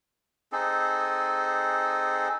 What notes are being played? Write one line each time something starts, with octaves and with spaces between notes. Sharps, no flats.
C4 D#4 G#4 A4